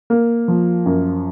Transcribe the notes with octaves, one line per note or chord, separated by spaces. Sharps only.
A#3
F3
F#2